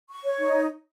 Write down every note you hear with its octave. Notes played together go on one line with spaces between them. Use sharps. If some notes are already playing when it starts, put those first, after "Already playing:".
C#6
C#5
D#4